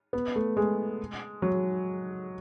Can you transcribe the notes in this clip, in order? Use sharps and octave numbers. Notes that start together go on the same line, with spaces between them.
B3
A3
G#3
F#3